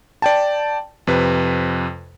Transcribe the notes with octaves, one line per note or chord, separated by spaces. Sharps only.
D5 G5 A5
F2 C3 B4